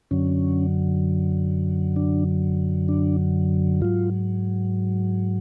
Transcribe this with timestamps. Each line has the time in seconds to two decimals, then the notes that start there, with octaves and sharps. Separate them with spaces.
0.11 F#2 D3 F#3 C#4
1.96 D4
2.89 D4
3.81 G#2 F#3 F4